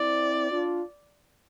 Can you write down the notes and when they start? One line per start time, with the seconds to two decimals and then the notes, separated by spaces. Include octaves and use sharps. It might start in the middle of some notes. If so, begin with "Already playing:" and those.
Already playing: C4 E4 D5
0.51 D4 F4